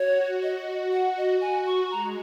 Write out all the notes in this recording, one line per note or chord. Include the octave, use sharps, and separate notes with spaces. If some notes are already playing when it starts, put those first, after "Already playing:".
Already playing: F#4 C#5
D#5
F#5
D#5
G#5
C#6
G#3 A#5